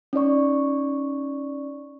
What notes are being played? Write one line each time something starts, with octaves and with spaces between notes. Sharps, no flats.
C#4 D#4 D5 C#6